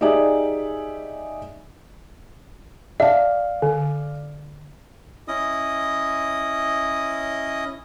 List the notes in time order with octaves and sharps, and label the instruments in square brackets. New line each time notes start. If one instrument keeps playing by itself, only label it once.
[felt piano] D#4 G4 G#4 D5 E5 G#5
[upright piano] D5 F5 [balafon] E5 A5
[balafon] D3
[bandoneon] C#4 E4 D#5 D#6